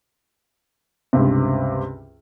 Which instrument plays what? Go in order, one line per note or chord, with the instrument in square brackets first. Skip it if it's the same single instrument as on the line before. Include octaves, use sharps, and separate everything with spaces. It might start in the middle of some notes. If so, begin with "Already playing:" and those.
[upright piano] C#2 G2 C3